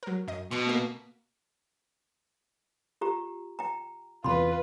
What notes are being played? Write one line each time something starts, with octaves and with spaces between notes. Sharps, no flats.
F#3 A#4
F#2 D#5
B2 B5 C#6 F#6
A3 A#3
F4 G4 A#5
G5 A#5
E2 C3 F4 B4 B5 C6